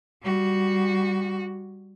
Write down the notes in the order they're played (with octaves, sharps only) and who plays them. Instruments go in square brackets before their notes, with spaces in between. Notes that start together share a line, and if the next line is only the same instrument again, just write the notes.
[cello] G3 F#4